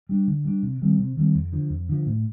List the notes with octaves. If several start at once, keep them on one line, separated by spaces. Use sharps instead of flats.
G3 D4
D3
G3 D4
C3
D#3 G3 C4
C3
D#3 G3 C4
F2
D3 F3
F2
D3 F3
A2